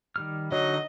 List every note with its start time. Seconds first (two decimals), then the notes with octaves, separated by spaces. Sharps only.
0.16 D#3 G3 F6
0.52 D3 F#3 D#4 D#5